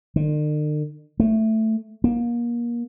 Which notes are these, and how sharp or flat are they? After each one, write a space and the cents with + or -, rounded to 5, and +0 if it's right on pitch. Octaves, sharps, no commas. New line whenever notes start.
D3 +45
A3 +5
A#3 +30